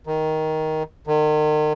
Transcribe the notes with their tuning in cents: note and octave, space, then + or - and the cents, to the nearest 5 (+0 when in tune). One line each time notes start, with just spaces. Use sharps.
D#3 +10
D#3 -35